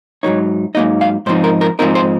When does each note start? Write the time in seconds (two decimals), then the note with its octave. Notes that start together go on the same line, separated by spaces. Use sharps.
0.23 G#2 F#3 A#3 D#4 C#5
0.75 G#2 F#3 A#3 D#4 D#5
1.01 F5
1.26 G#2 F3 C4 D#4 C5
1.44 A#4
1.61 A#4
1.79 G#2 F3 C4 D#4 A#4
1.95 C5